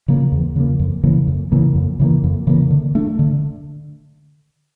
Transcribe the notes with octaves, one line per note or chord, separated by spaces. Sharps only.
C#3 F3 A#3
E2
C#3 F3 A#3
F2
C#3 E3 A#3
F2
C#3 E3 A#3
F2
C#3 E3 A#3
F2
C#3 E3 A#3
D3
A3 D4
D3